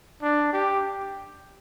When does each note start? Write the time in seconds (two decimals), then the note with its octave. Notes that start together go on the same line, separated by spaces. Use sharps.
0.22 D4
0.53 G4